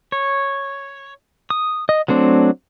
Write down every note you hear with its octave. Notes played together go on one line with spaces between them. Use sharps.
C#5
D#6
D#5
F#3 A3 C4 D4